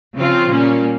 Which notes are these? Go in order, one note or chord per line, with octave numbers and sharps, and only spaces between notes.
C#3 F3 C4 F4
A#2 G3 A#3 C#4